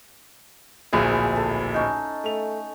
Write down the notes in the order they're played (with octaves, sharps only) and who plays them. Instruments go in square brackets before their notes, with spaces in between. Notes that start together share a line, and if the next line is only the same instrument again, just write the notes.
[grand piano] D1 A#1 G#4 [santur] E4 E5 G#5
[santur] A4
C#4 D#4
[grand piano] A3 F7